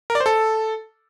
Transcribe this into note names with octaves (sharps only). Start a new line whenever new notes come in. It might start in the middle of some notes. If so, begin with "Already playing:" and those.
A#4
D5
C5
A4